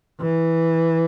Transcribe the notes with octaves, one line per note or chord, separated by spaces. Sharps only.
E3